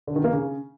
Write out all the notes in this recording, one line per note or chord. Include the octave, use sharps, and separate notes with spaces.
D3
D#3
A#3
C#3